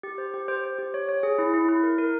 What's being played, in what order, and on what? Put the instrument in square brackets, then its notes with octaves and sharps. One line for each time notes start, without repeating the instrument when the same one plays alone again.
[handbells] G4
C5
G4
C5
C5
G4
C#5
C#5
G#4
E4
E4
E4
A#4
A#4